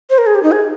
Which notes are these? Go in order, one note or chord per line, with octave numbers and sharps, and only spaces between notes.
C5
A#4
G#4
G4
D#4
G#4